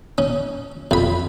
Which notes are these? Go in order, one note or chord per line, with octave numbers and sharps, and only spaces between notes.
C#4
F2 B5